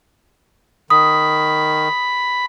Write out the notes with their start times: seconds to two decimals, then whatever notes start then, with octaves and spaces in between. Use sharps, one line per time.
0.90 D#3 B5 D#6